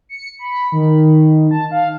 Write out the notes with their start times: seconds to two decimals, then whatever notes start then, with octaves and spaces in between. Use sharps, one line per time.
0.09 C#7
0.39 B5
0.72 D#3
1.51 A5
1.71 F5